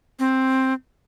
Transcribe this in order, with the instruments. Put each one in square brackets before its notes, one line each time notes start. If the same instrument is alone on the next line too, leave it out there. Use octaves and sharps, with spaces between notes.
[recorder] C4